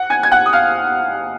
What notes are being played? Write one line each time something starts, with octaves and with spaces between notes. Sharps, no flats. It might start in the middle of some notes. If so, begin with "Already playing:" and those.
Already playing: F#5 F#6
G#5 G#6
G#6
F#5 F#6
D#6
F5 F6